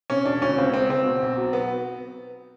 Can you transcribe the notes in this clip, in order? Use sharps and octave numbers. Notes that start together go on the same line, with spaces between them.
C3 C#4
E1 D4
D2 C#4
C#2 C4
G#3 C4
C#2 C4
B2
B1
F#3
B3